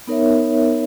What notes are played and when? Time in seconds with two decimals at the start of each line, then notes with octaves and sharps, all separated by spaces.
0.07 B3 D#4 A#4 C#5 E5